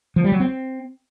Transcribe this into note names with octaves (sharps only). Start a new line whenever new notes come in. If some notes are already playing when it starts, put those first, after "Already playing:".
F3
G3
F#3
C4